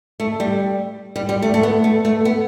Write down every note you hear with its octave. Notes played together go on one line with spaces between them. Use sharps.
A3
G3
G3
G3
A3
A3
B3
A3
A3
B3